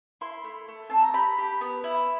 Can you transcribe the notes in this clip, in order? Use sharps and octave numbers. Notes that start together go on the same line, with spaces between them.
E4 C6
A3
A3
C4 A5
A#5
G4 B5
G4
B3
E4